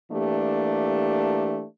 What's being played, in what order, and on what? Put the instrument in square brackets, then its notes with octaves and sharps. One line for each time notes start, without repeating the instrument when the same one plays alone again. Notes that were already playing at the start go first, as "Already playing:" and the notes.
[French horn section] E3 A3 A#3 D4 G4